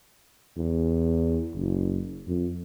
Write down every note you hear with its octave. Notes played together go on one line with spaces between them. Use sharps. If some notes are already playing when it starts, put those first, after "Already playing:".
E2
F#1
F2